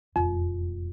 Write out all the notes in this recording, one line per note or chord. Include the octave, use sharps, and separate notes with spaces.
E1 F2 A2